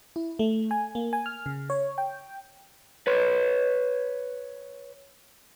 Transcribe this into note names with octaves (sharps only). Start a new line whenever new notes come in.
E4
A3
G#5
A#3
G#5
F6
C#3
C#5
G5
B4 C#5